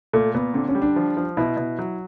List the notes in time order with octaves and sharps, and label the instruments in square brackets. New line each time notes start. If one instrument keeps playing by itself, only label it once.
[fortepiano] A#2 [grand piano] A3
[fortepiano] A#2 [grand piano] B3
[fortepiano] D3 [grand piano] C4
[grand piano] C#4
[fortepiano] G3
[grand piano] D4
[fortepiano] F3
F3
[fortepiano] B2 [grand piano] E4
[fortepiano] B2
F#3